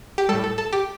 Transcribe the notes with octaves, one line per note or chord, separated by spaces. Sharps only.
G4
A2 G3 A4
A4
A4
G4